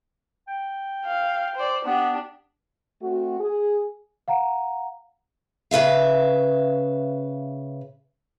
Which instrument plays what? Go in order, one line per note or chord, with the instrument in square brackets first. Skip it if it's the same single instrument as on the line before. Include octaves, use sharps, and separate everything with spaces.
[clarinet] G5
[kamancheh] F5
C5 D5
[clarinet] B3 [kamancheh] D4 G4
[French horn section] A3 C4 F#4
G#4
[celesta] F5 F#5 A#5
[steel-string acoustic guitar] C#3 B4 E5 F5